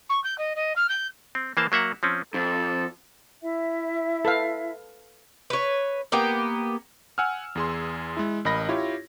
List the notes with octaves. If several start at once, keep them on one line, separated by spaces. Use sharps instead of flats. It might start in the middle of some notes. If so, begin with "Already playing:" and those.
C#6
G6
D#5
D#5
F6
G6
C4
E3 A#3 C5 A5
F#3 A#3 E5 F#5
F3 C4 C#4
F2 A4
E4 E5
A4 B4 F5
B4 C#5
A#3 B3 G4 G5
F#5 G#5 E6 F6
E2 G#4 C6
G#3 E4
A1 A#4 D#5 B5 A#6
E4 F4 G4 C#5